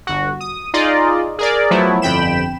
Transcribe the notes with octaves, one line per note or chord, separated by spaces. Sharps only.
G1 F#4
D#6
D#4 F4 G#4 D5 D#5
G#4 A#4 D5
F3 F#3 A3 B3 E4
G1 F2 G5 B5 E7